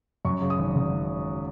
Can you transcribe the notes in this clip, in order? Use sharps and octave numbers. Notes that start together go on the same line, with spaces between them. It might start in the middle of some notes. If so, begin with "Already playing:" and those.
F#2 C#6
C#3
D#6
G#1
G#1